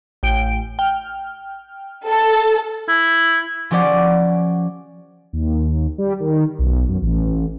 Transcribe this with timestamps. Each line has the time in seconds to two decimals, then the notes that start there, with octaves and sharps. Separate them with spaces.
0.23 A1 G5 D7
0.79 G5 F6
2.07 A4
2.89 E4
3.71 F3 C#4 G4 D5 F#5 D6
5.33 D#2
5.98 G3
6.20 D#3
6.59 B1
6.89 F#2
7.02 A1